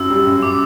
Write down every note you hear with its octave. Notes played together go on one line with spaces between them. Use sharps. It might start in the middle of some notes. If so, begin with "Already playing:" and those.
Already playing: F#2 F#4 E6
G3
F#2
D6